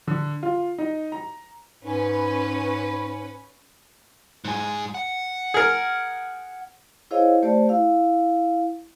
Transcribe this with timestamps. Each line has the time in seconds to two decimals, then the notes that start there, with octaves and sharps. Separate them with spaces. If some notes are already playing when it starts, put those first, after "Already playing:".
0.07 D3
0.43 F4
0.78 D#4
1.12 A#5
1.84 G#2 C#4 B4
4.45 G#2 G#4
4.94 F#5
5.54 G#4 A#4
7.11 E4 G#4 C5 C#5 D#5 F5
7.42 A3 G4 C5 D5 A5
7.69 E4 F5